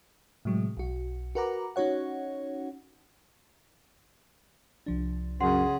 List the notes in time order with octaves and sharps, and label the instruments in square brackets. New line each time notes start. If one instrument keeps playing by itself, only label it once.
[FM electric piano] A2 C3 F#3 G#3
B1 F#4
F#4 A#4 B4 F#5 A#5 D6
C#4 D#4 F#4 C#5 F#5
C2 F3 D4
[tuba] F#2 [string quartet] C#3 G#4 [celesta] F#5 C6